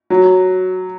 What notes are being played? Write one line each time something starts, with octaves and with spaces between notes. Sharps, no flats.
F#3